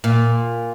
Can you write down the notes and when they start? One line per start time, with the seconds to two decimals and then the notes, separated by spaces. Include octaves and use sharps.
0.04 A#2